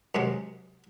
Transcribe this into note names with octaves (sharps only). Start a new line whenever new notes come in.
F#2 C3 G#3